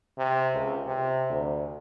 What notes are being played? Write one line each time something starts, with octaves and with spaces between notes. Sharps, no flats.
C3
C#2
C3
D2